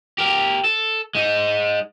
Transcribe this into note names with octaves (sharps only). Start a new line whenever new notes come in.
G4 A#4
A4
G#3 D#4